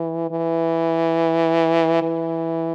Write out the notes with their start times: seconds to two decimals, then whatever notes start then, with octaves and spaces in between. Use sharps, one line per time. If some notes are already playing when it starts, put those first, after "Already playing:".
Already playing: E3
0.31 E3
2.02 E3